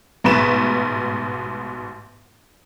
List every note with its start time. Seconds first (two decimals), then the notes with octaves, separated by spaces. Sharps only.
0.24 A1 G#2 B2 B4 E7